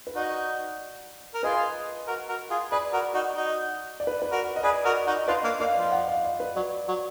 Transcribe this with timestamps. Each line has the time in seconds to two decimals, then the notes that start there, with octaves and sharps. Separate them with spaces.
0.07 B4
0.16 D#4 F#4 D5
1.34 A#4
1.43 F4 G#4 B4 D#5
2.07 F#4 A#4
2.29 F#4 A#4
2.50 F4 G#4
2.71 G#4 B4 D5
2.93 F#4 A#4
3.14 D#4 F#4
3.36 D#4 F#4
4.00 D5
4.07 B4
4.22 B4
4.31 F#4 A#4
4.56 D#5
4.63 G#4 B4 D5
4.85 F#4 A#4
5.07 D#4 F#4
5.28 D4 F4 B4 D#5
5.44 A#3 D4
5.60 A#3 D4 D5 F5
5.76 F3
5.92 D#5 F#5
6.08 D5 F5
6.25 D5
6.40 B4
6.56 F#3 D5
6.88 F#3